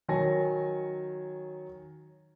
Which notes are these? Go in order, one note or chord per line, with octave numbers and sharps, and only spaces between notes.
D#3 F#3 C#5 G#5 A#6